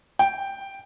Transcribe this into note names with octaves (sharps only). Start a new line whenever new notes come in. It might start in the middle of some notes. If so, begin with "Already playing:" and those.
G5